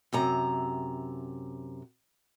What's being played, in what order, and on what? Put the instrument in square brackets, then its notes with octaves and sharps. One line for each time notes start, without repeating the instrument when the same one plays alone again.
[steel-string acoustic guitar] F#2 C3 A#5